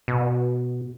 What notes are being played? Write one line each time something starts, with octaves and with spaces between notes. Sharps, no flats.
B2